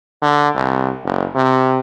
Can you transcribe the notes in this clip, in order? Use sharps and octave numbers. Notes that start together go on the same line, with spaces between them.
D3
C2
F#1
C3